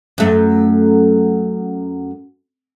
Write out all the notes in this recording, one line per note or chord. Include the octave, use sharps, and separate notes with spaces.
F#2 A3